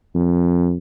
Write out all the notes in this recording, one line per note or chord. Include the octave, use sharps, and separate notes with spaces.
F2